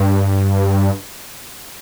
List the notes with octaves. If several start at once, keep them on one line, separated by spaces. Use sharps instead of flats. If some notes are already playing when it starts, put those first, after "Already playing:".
Already playing: G2